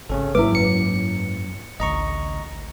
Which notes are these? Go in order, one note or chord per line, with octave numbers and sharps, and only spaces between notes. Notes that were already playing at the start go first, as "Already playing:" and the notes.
G#1 C#3 C#4 A4
G#2 F#3 A#3 E4 B4 E5 D6
F#2 C#7
A1 D2 D#5 A#5 C#6